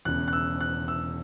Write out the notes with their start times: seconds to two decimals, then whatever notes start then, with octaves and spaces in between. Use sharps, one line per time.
0.05 E1 E2 C#3 F#6
0.28 F#6
0.33 E6
0.60 F#6
0.88 E6